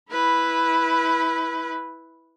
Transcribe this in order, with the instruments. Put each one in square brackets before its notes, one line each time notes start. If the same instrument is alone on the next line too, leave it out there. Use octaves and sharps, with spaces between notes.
[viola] E4 B4